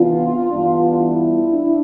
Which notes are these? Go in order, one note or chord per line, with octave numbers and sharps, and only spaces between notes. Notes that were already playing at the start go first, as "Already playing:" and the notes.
Already playing: C3 E3 B3 D4 F4
G2 E3 B3 D4
E4
D4